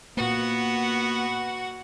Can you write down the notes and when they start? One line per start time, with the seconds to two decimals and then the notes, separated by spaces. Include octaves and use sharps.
0.17 A#2 A#3 B3 F#4 F#5